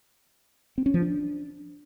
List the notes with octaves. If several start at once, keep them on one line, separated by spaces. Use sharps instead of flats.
C4
C#4
F3
D4